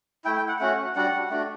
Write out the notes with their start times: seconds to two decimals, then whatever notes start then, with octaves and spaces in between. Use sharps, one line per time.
0.25 A3 E4 G5
0.37 G5
0.48 F#5
0.60 A3 C#4 F#4 F#5
0.95 G3 D4 F#4 F#5
1.30 A3 D4 F#4